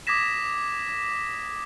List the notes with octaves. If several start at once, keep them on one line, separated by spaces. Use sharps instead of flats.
D6 D#6 G#6 A#6 B6 E7